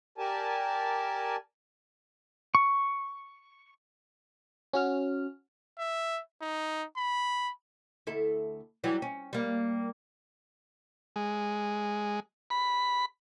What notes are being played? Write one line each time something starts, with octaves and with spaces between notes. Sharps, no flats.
G4 A#4 D5 G#5 A5
C#6
C#4 F#4 F6
E5
D#4
B5
D2 E4 A4
E3 F#3 G3
C#4
G3 A#3
G#3
B5